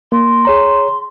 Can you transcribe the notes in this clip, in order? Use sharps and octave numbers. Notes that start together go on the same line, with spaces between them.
A#3 C6
G#4 C#5 A#5